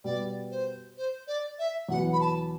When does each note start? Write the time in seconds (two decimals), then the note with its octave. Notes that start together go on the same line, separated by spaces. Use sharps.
0.04 B2 G3 B3 D5
0.50 C5
0.97 C5
1.27 D5
1.59 E5
1.89 E2 B2 F#3 B3 F#5
2.13 B5
2.20 A5